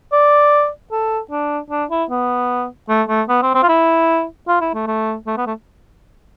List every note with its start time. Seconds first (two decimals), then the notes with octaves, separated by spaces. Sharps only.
0.13 D5
0.92 A4
1.31 D4
1.71 D4
1.90 E4
2.10 B3
2.89 A3
3.09 A3
3.29 B3
3.43 C4
3.55 C4
3.63 F4
3.69 E4
4.48 F4
4.61 E4
4.75 A3
4.88 A3
5.27 A3
5.37 B3
5.46 A3